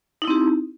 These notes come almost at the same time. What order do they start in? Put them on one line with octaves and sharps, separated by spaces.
D#4 E4 C4 G4